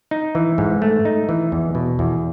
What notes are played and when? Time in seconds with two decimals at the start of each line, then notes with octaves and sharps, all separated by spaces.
0.11 D#4
0.35 E3
0.58 G#2
0.82 A3
1.05 D#4
1.29 E3
1.52 E2
1.75 B2
1.99 E2